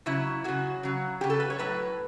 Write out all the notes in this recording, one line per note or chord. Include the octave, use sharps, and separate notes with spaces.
C#3 F#3 E4
C#3 F#3 F#4
C#3 F#3
C#3 F#3 G4
A4
B4
C#5
A2 F#3 B4